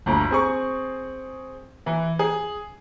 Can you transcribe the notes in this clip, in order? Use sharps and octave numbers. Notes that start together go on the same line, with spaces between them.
G1 D2
C4 G#4 C#6
E3 E4
G#4